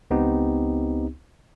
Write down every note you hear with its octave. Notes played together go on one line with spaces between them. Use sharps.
C#2 B3 C4 D#4 G4